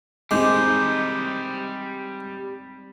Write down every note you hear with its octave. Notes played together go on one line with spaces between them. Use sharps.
G3 G#3 C4 D#4 G4 D#5 D6 G6